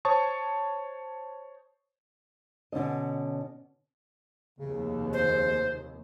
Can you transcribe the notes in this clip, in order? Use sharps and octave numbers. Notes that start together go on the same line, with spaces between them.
C5 C#5 A5 C#6 D#6
B2 D3 C#4 D#5
F1 D#2 C#3
C5